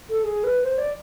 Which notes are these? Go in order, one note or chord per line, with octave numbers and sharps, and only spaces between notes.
A4
G#4
B4
C5
D5